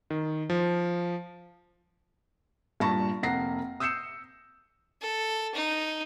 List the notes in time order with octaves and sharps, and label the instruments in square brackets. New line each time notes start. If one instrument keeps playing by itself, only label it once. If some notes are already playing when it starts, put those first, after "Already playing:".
[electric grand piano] D#3
F3
[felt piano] G2 A#2 A5 B5 C#6 A#6
F1 A#3 F#5 A#6 C7
D#6 E6 G6 C7 C#7 E7
[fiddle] A4
D#4